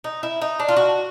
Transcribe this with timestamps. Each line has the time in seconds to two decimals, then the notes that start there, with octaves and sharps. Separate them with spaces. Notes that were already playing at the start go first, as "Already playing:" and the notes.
0.04 D#4
0.23 E4
0.42 D#4
0.60 D4
0.68 F4
0.77 F#4